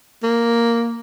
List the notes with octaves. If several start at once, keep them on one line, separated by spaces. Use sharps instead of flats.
A#3